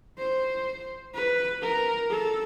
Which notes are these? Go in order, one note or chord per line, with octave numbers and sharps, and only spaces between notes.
C5
B4
A#4
A4